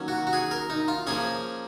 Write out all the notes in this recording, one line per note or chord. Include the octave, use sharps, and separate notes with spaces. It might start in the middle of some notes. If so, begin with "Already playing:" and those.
Already playing: D#3 F#3 A#3 C#4
F#4
F#4
G#4
A#4
D#4
F4
F3 A#3 C#4 G#4